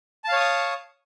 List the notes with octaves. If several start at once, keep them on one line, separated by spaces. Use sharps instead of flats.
C#5 F5 A5 C#6 D#6